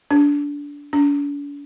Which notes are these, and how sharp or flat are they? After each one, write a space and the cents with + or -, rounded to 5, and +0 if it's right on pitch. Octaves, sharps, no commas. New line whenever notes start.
D4 -20
D4 -45